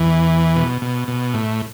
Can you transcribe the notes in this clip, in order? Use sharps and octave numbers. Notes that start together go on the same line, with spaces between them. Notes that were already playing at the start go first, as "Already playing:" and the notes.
Already playing: E2 E3
B2
B2
B2
A2